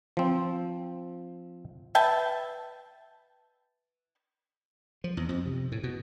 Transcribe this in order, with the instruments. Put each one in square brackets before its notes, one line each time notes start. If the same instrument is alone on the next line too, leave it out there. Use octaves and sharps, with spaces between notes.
[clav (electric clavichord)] F3 C4
[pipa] B4 E5 G5 A5
[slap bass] F3
E2
F2
C3
A2
B2